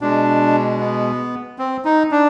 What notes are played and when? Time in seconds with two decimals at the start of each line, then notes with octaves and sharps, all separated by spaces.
0.01 B2 G#3 D4
0.80 B3
1.59 C4
1.85 D#4
2.11 D4